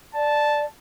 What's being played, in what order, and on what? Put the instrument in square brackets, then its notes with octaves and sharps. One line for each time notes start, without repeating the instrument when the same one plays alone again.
[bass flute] D5 [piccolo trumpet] A5